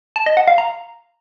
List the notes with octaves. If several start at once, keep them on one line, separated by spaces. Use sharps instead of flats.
A5
D#5
F#5
F5
A#5